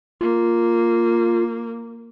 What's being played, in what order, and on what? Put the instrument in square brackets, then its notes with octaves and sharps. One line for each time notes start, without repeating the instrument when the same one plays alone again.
[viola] A#3 [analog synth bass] F4